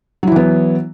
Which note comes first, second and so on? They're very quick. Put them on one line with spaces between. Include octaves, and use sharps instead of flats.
F#3 E4 E3 B3